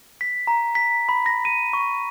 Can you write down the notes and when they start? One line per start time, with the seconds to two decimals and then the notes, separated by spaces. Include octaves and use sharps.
0.21 B6
0.47 A#5
0.75 B6
1.09 B5
1.26 A#6
1.45 D#7
1.73 C#6